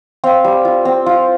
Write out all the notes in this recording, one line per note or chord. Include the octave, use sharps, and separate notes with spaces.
C4 F5
G3
F4
C4
F4